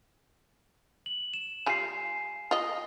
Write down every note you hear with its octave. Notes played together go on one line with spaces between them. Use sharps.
F#7
E7
G3 F4 G#5 C7
F4 D#5